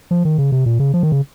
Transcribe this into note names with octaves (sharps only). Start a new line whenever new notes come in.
F3
D#3
C#3
C3
A#2
C#3
F3
D#3
C#3